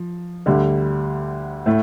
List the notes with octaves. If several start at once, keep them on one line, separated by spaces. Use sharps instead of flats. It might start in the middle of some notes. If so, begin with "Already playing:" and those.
Already playing: F3
D2 D3 G3
A2 A3